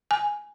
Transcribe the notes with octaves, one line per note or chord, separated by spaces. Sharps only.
G#5